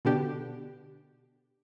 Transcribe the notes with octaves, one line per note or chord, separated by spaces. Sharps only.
B2 D3 D4 G4